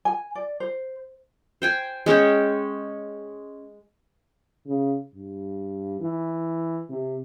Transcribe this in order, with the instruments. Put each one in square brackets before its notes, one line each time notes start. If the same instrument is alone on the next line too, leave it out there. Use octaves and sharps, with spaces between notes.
[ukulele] G#5
D5
C5
[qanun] C5 G5 G#5
G#3 C#4 C#5 G5
[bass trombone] C#3
G2
E3
C3